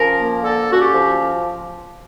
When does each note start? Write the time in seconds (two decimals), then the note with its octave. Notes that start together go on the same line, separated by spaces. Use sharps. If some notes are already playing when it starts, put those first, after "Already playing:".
Already playing: F3 C#4 A#4
0.18 A#3
0.43 D3 A4
0.68 C#4 F#4
0.80 G4
0.92 F3